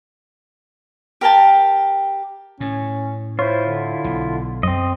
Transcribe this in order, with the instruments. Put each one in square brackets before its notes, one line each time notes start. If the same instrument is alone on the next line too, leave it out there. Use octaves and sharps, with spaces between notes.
[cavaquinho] G4 A#4 G5 A5
[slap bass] A2 [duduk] C#4
[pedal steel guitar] E4 F4 [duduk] C5 [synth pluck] C#5
[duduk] D3
[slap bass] B1
[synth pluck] F#2 [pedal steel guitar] C4 D#5